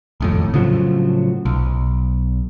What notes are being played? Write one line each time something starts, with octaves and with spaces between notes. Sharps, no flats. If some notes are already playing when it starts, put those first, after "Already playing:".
D#1 F2 A2
A2 C#3 F3 F#3
B1